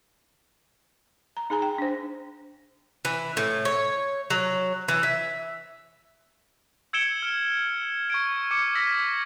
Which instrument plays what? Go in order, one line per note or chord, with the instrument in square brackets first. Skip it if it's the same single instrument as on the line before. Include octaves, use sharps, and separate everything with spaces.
[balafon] A#5
D#4 G#4 G#5 A#5
G5
D4 C5
[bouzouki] E3
A2
C#5
F#3
E3
E5
[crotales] E6 G#6 C#7 D7 E7 G7
F6 D7 G7
C#6 G#6 D7
D6 F6 C#7
E6 G#6 A#6 B6